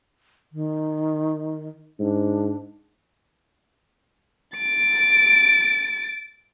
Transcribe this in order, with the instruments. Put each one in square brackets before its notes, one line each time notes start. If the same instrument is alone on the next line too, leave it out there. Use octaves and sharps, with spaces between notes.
[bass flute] D#3
[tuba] G#2 [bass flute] D4
[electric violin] A6 D7